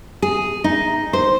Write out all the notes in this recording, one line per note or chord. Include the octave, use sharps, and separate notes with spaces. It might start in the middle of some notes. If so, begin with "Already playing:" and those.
G#4
D#4
C5